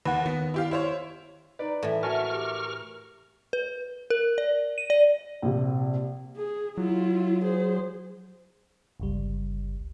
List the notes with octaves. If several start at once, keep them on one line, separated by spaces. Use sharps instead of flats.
D#2 B4 F#5
D#3 B3
E4 G4 F5
E4 C5 C#5
D#4 B4 D5
A2 E3 E5
F#4 A#4 G#5 A5 C#6 F6
G4
B4
A#4
D5
D#7
D5
A#1 C3
G#4
F#3 E4 F4
G#4 C5
G1 C#2 G3